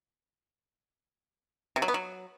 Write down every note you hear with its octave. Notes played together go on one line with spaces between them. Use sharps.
C3
F#3
B3
F#3